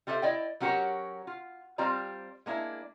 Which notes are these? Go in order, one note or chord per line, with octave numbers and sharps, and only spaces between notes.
G3 F4 G4 A4 C5 E5
E4 D5 D#5 G5
F#3 C#4 F#4 G4 A#4 C#5
F4
G3 C4 F4 C5 D5 A#5
G#3 A#3 D4 E4